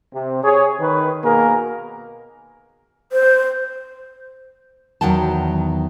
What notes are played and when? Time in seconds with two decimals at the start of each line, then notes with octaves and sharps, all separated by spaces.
0.13 C3
0.44 G#4 C#5
0.80 D#3 B4
1.23 B2 A#3 G#4 A#4
3.12 C5
5.01 E2 D#3 F#3 F#5 G5 A5